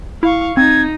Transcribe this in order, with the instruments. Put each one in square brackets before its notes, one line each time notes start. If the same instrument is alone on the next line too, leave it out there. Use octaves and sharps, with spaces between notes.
[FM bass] E4 [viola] F5 C#6
[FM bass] C4 [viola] D#4 [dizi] G#6